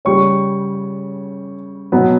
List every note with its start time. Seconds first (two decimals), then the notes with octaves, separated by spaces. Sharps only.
0.05 C#3 G3 C#4 C#6
1.92 B2 F#3 B3